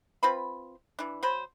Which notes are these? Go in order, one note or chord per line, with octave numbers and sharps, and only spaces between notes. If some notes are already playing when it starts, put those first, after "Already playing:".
C4 F4 B4 B5
E3 D4
F#3 C5 B5